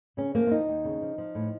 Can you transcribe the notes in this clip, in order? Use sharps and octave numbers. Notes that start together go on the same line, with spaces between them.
C#3 C#4
F3 A#3
F4
D#2 D#4
D#2
C#3
F3
F3
A2